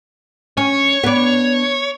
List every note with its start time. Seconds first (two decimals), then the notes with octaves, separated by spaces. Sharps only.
0.57 C#4 C#5
1.04 B3 D4